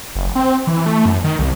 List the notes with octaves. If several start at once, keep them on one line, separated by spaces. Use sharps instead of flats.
F#1
C4
E3
A3
F#2
D#3
C2